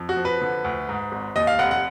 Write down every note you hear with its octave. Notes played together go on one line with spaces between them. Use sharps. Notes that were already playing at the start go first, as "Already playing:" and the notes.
Already playing: F2
F#4
F3
B4
D3
D2
G#2
G#1
D#2 D#5
F5
F1 F#5
F#5